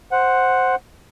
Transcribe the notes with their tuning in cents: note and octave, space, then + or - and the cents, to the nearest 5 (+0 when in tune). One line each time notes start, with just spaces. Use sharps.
C5 +0 F#5 +0